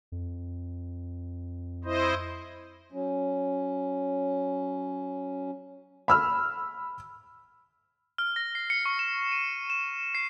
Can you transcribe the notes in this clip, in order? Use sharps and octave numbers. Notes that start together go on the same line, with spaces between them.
F2
E4 C5 D#5
F#3 C#4
B5 E6 F6
F6
A#6
C7
C#7
C#6
E7
D#7
E7
C7